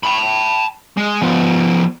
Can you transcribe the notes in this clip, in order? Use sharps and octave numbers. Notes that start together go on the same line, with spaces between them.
A5 B5
G#3
F3 B3